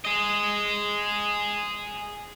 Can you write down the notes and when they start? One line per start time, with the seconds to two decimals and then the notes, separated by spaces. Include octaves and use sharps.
0.05 G#4 D#5